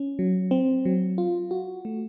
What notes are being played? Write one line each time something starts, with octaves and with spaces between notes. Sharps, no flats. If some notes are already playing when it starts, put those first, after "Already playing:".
Already playing: C#4
F#3
C4
F#3
F4
F#4
A3